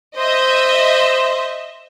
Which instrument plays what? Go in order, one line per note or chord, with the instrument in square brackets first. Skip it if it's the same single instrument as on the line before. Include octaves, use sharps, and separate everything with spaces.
[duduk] C5 [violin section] D#5 E5